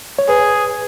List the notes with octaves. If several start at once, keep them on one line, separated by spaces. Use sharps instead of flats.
C#5
G#4 B4